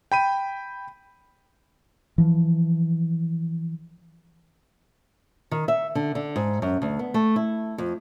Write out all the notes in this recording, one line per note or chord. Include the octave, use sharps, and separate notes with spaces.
G5 B5 D#7
E3 F3
D#3
E5
D3
D3
G#2
F#2
D2
B3
A3
E4
F2